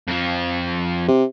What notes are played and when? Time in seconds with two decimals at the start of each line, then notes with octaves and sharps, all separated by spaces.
0.07 F2 F3
1.08 C3